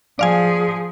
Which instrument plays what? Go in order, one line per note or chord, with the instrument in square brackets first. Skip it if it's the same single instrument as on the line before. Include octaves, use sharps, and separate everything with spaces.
[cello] F3 G#4 [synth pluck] D5 F5 G#5